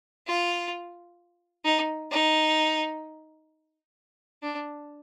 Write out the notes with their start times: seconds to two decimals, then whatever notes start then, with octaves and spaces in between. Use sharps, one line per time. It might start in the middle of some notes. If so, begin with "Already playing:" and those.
0.27 F4
1.65 D#4
2.11 D#4
4.42 D4